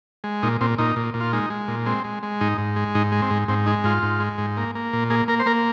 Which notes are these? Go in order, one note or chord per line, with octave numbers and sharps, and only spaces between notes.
G#3
A#2 D#4
A#2 C4
A#2 D#4
A#2
A#2
F4
G#3 D#4
G#3
A#2
G#3 C4
G#3
G#3
G#2 D#4
G#2
G#3
G#2 D#4
G#3
C4
G#2
G#2 C4
G#3 D#4
G#2 F4
G#2
G#3
G#2
A#3
A#3
A#2
A#3 G#4
A#3 A#4
C5
A#3 A#4